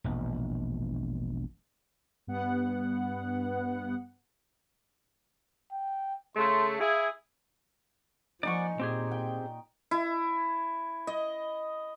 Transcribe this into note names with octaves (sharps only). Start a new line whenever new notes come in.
E1 A#1
G2 B3 F#5
G5
C#3 A3 C6
E4 G#4 F5
F3 D#4 D5 F#5 G#5 C#6
A#2 C4 G4 G#4
G5
E4
D#5